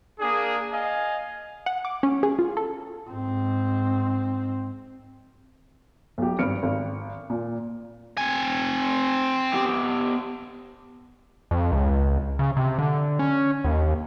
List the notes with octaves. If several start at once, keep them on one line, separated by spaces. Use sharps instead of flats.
A#3 D4 G#4
D#5 F5 G#5
F#5
D6
C#4
G#4
F4
A4
G#2 C4
B1 G4
G#1 G2 B3 F6 C#7 D7
G#1
A#2
C4 G#5
B3 G4 G5
F2
C#2
C#3
C3
D3
C#4
D#2